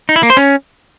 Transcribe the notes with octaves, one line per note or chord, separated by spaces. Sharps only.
D#4
E4
A#3
C5
C#4